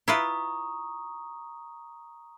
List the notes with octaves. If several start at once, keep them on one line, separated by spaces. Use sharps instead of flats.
E4 F4 B4 A#5 C#6 D#6